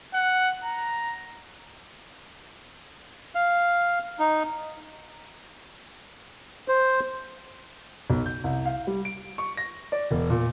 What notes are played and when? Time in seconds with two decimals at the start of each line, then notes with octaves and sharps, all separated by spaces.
0.14 F#5
0.64 A#5
3.35 F5
4.19 D#4
6.68 C5
8.10 B1
8.26 G6
8.44 C2
8.66 F5
8.87 G3
9.05 D7
9.38 C#6
9.57 A#6
9.92 D5
10.11 E1
10.30 A#2